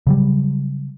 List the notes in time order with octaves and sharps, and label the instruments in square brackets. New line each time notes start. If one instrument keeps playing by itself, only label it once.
[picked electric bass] C#3 F#3 G3